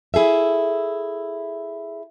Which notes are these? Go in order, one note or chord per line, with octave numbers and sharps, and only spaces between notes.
E4 G#4 A4 E5